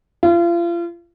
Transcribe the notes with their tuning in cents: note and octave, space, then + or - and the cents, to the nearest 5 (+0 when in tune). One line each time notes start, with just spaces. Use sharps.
F4 -35